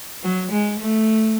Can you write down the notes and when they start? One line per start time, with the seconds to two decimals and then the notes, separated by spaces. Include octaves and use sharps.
0.23 F#3
0.51 G#3
0.80 A3